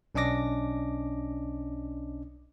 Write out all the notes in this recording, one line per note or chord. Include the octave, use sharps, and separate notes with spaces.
B1 C#4 D4 D#5 D6 A#6